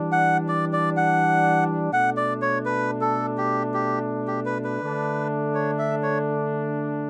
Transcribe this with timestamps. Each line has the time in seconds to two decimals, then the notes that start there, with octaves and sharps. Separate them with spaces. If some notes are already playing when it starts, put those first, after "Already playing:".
Already playing: E3 G3 D4
0.12 F#5
0.48 D5
0.73 D5
0.97 F#5
1.93 B2 A3 D4 F#5
2.17 D5
2.42 C#5
2.66 B4
3.01 A4
3.38 G4
3.74 G4
4.27 G4
4.45 B4
4.64 B4
4.82 D3 A3 D4
5.54 C#5
5.78 E5
6.03 C#5